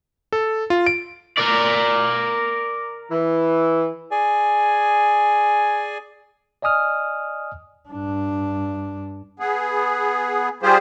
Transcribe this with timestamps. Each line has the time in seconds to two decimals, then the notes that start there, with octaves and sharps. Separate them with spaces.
0.32 A4
0.70 F4
0.86 D7
1.37 A#4 D5
3.11 E3
4.11 G#4 D5 G#5
6.62 D5 D#5 G#5 D#6 F6
7.89 G2 D4
9.39 B3 G#4
10.63 G3 F4 G4 G#4 C5